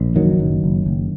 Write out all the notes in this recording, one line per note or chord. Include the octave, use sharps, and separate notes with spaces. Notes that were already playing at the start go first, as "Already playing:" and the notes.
Already playing: A#1
F#1 D#3 F#3
F#1
F#1
F#1